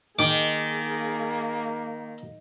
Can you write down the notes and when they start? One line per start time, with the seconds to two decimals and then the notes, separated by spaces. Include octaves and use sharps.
0.19 D#3 A#3 G#4 D6